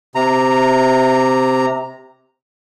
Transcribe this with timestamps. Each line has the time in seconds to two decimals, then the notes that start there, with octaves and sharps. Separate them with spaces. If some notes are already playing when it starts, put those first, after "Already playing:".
0.15 C3 A#5